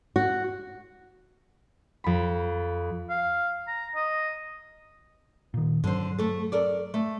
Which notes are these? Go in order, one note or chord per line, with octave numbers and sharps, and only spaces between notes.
F#4
F2 B5
F5
A#5
D#5
A#2 D#3
G2 D3 F#3 C5
A3 A4
A4 A#4 D5
A3